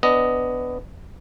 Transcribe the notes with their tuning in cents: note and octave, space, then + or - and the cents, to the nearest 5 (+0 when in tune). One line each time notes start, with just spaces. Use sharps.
B3 +15 D4 +0 D#5 +0